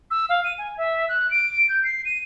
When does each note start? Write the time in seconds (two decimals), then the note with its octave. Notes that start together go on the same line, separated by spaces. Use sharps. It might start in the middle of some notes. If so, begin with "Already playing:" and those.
0.11 E6
0.29 F5
0.44 D#7
0.58 G#5
0.77 E5
1.09 F#6
1.31 D7
1.69 G6
1.84 C7
2.05 D#7